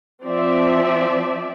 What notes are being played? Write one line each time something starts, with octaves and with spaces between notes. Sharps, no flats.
F3 C4 D5 E5